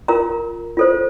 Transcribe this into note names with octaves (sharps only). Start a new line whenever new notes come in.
F4 A#4 A#5
F4 A4 C5